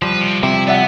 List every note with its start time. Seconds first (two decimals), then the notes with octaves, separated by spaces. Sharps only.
0.02 F3 G3 B4
0.21 C3
0.43 C3 E4
0.67 B3 D5 E5 F#5